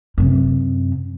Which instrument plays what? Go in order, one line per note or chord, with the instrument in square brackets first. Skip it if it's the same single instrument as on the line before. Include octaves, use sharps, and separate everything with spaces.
[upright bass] F#2 C3